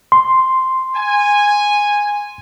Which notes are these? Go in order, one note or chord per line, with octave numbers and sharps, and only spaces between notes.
C6
G#5